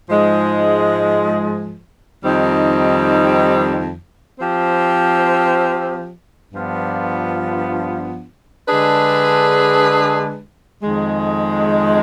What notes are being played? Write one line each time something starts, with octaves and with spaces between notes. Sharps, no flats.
G#2 F3 G#3
F2 D#3 G3 C4 D#4
F3 C4 G4
G2 F3 B3 D4 F4
D3 G#3 D4 G#4 B4
F2 D#3 G#3